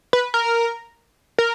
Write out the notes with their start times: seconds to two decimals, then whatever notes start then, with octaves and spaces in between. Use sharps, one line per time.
0.13 B4
0.34 A#4
1.38 A#4